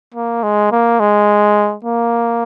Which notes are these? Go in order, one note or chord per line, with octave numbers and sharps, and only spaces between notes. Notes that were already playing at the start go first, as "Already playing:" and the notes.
A#3
G#3
A#3
G#3
A#3